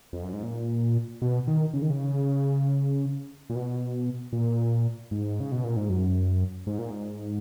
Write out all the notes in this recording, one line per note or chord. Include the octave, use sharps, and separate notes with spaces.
F2
F#2
G#2
A#2
B2
D#3
C#3
D#3
C#3
A#2
B2
A#2
G#2
C#3
B2
A#2
G#2
F#2
G#2
A#2
G#2